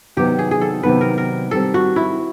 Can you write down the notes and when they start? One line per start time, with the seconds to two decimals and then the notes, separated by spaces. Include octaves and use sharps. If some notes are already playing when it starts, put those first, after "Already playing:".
0.17 C3 D#3 F#3 B3 D#4 G4
0.39 G#4
0.51 G#4
0.61 A4
0.83 C3 D#3 F#3 B3 D#4 B4
1.01 A#4
1.18 A#4
1.51 D#3 G3 C4 A4
1.74 F#4
1.96 E4